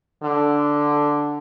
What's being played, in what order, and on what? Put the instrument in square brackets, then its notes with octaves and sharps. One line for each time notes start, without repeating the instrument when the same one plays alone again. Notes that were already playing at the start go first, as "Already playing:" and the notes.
[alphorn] D3